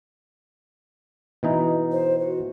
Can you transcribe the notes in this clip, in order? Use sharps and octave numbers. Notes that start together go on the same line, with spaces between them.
B2 E3 D#4
C5
F#4